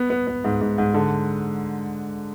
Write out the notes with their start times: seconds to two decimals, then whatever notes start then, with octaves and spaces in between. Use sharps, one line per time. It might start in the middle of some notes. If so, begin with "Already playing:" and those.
Already playing: B3
0.10 B3
0.27 B3
0.44 G#2
0.61 G#2
0.78 G#2
0.94 D3